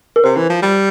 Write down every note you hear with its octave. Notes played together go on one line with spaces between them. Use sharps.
A#4
C3 C5
E3
F3
G3